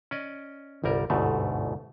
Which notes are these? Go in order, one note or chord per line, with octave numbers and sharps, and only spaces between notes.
C#4 D5 D#5
G1 C2 G3 A#4
G1 D2 G#2 B2 A3